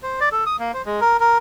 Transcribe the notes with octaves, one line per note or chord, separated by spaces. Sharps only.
C5
D5
A4
D#6
A#3
C5
G#3
A#4
A#4